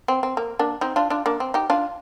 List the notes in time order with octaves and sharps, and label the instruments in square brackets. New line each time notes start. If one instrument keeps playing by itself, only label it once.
[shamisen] C4
C4
A#3
A#3 D4
C4 D#4
D4 F4
D4 F4
A#3 D4
C4
D#4 G4
D4 F4